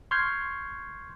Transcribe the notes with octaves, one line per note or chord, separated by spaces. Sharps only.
C6 C#6 F6 G6 G#6 C7